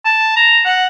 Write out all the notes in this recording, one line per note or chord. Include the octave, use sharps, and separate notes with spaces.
A5
A#5
F#5